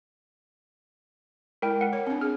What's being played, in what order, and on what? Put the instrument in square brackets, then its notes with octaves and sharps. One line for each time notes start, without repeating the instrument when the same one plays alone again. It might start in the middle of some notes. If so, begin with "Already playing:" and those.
[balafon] G#3 E4 [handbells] A#4 G5
[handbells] A#4 F#5
[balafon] C#5
C4 D4
[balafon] G#4 [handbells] F6